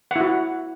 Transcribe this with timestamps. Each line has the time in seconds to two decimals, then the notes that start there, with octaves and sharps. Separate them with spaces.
0.11 F#5
0.16 E4
0.20 F#4